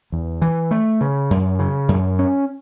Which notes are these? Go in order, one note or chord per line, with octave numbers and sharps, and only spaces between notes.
E2
E3
A3
C#3
F#2
C#3
F#2
C#4